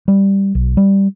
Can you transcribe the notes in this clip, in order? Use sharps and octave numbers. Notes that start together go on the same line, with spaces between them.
G3
B1
G3